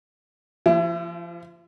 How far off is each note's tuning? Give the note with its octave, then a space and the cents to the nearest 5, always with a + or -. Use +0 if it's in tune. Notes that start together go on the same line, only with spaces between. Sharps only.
F3 -30 E4 +35